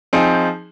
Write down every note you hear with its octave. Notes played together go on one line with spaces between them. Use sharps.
F3 C4 D#4 G#4